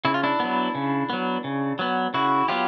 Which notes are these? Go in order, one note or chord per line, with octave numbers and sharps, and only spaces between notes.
C#3 E4
F4
D4 E4
F#3 B3
C#3
F#3 B3
C#3
F#3 B3
C#3 E4 F#4
F#3 B3 F4 G4